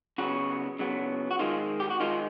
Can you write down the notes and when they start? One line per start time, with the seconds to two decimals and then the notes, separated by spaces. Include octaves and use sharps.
0.18 C#3 F#3 B3 F#4
0.79 C#3 F#3 B3
1.31 F#4
1.39 D#3 G#3 C4 F4
1.80 G4
1.90 F#4
2.00 D#3 G#3 C4 F4